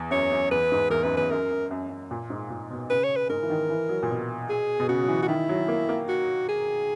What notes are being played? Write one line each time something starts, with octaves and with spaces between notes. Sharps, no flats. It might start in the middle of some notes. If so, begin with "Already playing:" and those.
Already playing: E2
F#2 C#5
F#2
E2 B4
G#2
E2 A#4
F#2 B4
E2 B4
F#2 A#4
F#2
F#2
F#2
A#2
G#2
A#2
B2
C#3 B4
C#5
B4
G#2 A#4
E3
D#3
E3
F#3
A#2
B2
G#4
B2
C#3 F#4
F#3
E3
F#4
D#3 E4
F#3
A#3
A#3
F#4
G#4